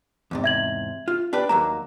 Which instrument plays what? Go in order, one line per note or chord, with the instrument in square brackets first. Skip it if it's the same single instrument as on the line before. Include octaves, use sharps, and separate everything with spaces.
[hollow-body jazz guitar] E2 G#2 C3
[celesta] E5 G#6 F#7
[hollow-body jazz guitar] F4
D4 G4 B4
[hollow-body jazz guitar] D#2 F#3 A#3 [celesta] A#5